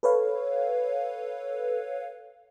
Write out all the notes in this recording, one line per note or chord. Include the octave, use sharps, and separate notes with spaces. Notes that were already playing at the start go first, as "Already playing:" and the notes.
A4 B4 C#5 F5